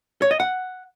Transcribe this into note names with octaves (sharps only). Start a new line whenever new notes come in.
C#5
D#5
F#5